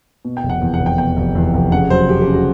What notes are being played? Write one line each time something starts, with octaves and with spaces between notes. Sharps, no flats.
B2
G5
F1
F#5
E2
F#5
F1
G5
B2 G5
F1
E2
F1
C#3 F#5
F#3 C5
C#3 G4
G4
C#3
F#4